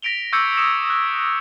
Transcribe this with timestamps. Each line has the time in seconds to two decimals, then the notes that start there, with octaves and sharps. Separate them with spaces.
0.02 A#6 B6 D7 F7 G7
0.32 C#6 D6 E6 G6 G#6 C#7
0.57 D#6 C#7 E7
0.90 F#6